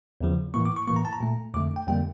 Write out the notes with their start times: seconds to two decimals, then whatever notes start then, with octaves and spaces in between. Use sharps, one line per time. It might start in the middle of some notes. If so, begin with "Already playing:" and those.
0.21 E2 C#3 F3
0.54 A2 E3 A#3 C#6
0.65 D6
0.76 C#6
0.87 A2 E3 A#3 C#6
0.96 A#5
1.05 A5
1.13 A#5
1.20 A#2 A3
1.54 F2 D3 A3 D6
1.76 G5
1.87 F2 D3 G3 A#3 G5